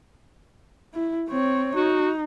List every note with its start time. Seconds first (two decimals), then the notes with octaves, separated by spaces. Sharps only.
0.94 E4
1.30 C4 C#5
1.76 D#4 F#4